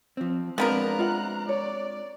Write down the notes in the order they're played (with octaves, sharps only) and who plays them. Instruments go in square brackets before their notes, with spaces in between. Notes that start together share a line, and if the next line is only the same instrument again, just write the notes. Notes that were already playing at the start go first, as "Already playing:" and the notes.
[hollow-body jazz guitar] F3 C4
[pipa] F3 B3 A#4 [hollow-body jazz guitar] G#3 C4 D4 [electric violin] A#5 F#6
[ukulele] F4 E5 F#5
[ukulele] C#5 [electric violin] D5